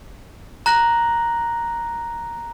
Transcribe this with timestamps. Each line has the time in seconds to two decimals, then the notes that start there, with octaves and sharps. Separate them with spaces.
0.66 A#5 F#6 A#6 F#7